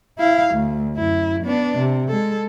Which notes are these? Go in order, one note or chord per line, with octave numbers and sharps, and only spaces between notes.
E4 F5
D2
F#2 E4
B3 D4
C3
G#3 A4